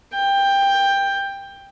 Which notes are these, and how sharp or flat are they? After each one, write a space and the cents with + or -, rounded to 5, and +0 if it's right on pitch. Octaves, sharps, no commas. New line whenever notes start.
G5 +15